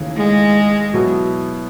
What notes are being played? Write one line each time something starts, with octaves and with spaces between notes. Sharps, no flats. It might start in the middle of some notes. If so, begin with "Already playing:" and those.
Already playing: D#2 C#3 E3 A3
G#3
B2 F#3 B3 E4